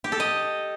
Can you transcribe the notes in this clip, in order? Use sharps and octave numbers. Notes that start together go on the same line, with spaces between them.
G4
A4
D#5